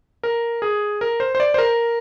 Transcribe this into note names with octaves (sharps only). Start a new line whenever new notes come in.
A#4
G#4
A#4
C5
C5
D5
C5
A#4